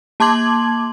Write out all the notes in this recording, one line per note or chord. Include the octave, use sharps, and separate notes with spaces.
A#3 A5 C6 D6 G#6 F#7